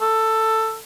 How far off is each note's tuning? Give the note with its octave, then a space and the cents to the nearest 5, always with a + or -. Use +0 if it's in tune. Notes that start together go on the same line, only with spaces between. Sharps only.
A4 +10